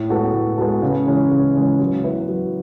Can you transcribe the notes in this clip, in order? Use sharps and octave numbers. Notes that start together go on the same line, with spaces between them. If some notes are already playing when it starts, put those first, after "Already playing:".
Already playing: A2
G#3 B3 F#4 A4
A2
G#3 B3 F#4 A4
C#3
E3 G#3 C#4
C#3
E3 G#3 C#4
F#3
B3 E4 B4
F#3